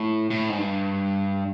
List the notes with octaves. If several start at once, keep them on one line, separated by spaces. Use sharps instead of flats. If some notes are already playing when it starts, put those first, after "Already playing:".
Already playing: A2
A2
G#2
G2